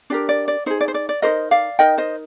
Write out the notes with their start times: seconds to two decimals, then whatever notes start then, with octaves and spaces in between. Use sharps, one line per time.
0.10 D4 G4 A#4 D5
0.29 D5
0.48 D5
0.66 D#4 G#4 C5
0.81 D5
0.88 C5
0.94 D5
1.09 D5
1.22 D#4 G4 A#4 C5 D#5
1.51 D5 F5
1.79 D#4 A#4 D#5 G5
1.98 C5 D#5